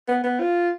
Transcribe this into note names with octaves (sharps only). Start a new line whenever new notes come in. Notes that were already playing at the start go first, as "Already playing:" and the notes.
B3
B3
F4